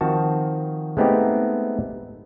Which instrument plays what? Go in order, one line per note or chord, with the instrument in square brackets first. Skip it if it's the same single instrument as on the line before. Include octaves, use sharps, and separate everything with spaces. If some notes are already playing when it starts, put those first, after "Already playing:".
[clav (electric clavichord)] D#3 F3 C4 F#4 A5
G#3 A3 B3 C4 D#4 G4